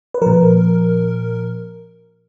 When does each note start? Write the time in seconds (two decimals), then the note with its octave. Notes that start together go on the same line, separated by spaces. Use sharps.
0.14 B4
0.22 A#2 F3 A#4